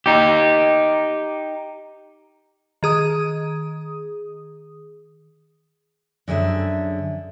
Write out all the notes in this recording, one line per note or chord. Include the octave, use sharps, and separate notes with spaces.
D#4 G4
D#3 G#4 D#6
F#2 D3 G#4 E5